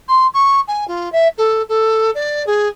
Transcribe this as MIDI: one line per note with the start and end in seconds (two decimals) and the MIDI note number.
0.08 0.27 84
0.33 0.60 85
0.67 0.87 80
0.87 1.11 65
1.12 1.28 76
1.37 1.62 69
1.68 2.10 69
2.14 2.45 74
2.46 2.68 68